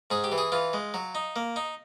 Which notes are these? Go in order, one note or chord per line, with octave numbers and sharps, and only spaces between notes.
G#2 G#4
G4
E3
G#4
E3 F4
G#3
F#3
D#4
A#3
D#4